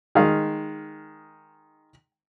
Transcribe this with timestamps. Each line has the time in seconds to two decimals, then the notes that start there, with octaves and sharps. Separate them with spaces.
0.15 D#3 G#3 F5